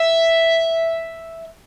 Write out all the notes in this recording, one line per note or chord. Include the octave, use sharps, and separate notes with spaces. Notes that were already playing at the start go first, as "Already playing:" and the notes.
Already playing: E5